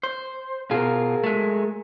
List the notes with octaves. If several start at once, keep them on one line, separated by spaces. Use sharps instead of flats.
C5
B2 F4 G#4 A#4
G#3 A3